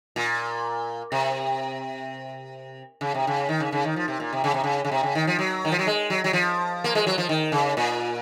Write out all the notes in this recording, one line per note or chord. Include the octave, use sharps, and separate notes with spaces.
A#2
C3
C#3
C3
C#3
D#3
C#3
C#3
D#3
F3
C3
A#2
C3
C#3
C3
C#3
C#3
C3
C#3
D#3
F3
F#3
D#3
F3
F#3
G#3
F#3
F#3
F3
A#3
G#3
F#3
F3
D#3
C#3
A#2